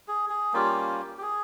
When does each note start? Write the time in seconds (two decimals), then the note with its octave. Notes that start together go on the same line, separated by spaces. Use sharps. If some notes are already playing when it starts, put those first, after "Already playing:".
0.08 G#4
0.30 G#4
0.53 G3 A#3 C#4 F4 G4
0.69 G4
1.18 G4
1.22 G#4